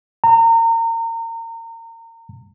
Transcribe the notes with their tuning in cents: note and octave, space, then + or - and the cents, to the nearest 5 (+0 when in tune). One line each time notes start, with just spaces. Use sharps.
A#5 -30